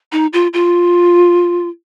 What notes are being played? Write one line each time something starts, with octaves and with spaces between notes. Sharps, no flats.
D#4
F4
F4